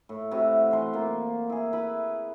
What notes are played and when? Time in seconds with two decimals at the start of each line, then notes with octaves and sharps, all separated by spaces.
0.09 A2
0.31 C3 E4 F#4 B4
0.71 E3 C5 C6
0.93 A#3 F4
1.50 E4 G#4
1.73 E4 B4 B5